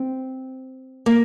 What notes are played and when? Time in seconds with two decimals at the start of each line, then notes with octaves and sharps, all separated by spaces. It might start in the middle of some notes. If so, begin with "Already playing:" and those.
Already playing: C4
1.06 A#3